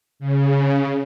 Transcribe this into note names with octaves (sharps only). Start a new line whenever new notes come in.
C#3